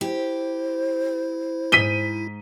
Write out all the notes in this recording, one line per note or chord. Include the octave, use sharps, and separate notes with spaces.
E4 G4 C5
G#2 B6 D#7 G7